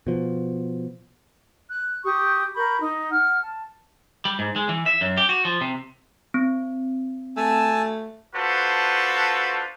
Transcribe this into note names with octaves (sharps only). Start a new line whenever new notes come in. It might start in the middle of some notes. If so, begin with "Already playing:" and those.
B2 F3
F#6
G4 C#6 D#6
A#4 B5 C#6 G6
D#4
F#5 F6
A5
G3
G#2
G#3
E3
E5
F#2
G4
F#4
F3
C3
C4
A3 G#5 A5 E6
D4 F4 F#4 A4 B4 C5